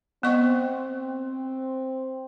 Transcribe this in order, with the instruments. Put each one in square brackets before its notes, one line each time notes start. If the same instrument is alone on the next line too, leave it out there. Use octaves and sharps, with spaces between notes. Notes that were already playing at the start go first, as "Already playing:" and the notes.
[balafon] B3 D#5 C#6 [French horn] C4